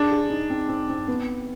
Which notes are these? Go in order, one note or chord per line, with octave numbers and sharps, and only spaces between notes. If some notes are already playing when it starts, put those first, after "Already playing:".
Already playing: D4 G#4
G#4
D#4
C4
C4
C4
B3